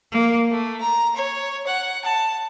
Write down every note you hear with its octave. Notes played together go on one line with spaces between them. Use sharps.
A#3
A3
A#5
C#5
F#5
A5